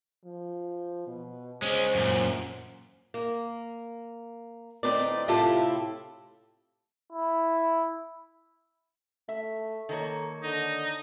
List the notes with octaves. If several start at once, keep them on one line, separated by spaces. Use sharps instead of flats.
F3
B2
G#3 C#4 C5
F#2 A#2
A#3
D2 A2 C4 D#4 B4 D5
A2 C3 E4 F4 G4 A4
E4
A3 E5
D#3 A#3 A4 C#5
D3 D#4